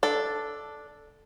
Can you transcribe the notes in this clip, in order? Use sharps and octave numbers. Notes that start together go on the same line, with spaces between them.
D4 A4